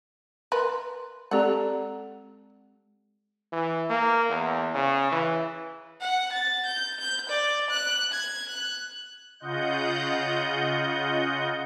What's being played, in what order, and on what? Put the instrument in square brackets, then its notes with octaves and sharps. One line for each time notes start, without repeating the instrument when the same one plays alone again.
[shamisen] A#4 B4 [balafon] C6
[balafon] G#3 C4 G4 [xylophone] A4 D5 A#5 [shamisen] F#5
[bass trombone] E3
A#3
E2
C#3
E3
[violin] F#5
A6
G6
G6
D5
F#6
G#6
F#6
[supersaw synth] C#3 F4 D#5 F#5 G6